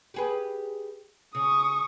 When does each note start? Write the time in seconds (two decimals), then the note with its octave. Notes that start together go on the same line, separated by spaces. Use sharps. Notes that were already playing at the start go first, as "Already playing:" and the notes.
0.14 G4 G#4 B4
1.35 C#3 C#6 D#6